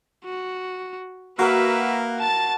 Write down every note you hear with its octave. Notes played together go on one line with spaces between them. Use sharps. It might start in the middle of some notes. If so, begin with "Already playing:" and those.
F#4
A#3 F#4 A#4 B4 E5 F#5
A5 A6